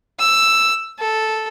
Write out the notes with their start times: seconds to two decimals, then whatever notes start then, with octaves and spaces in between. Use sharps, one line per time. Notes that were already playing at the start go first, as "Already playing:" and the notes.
0.20 E6
0.99 A4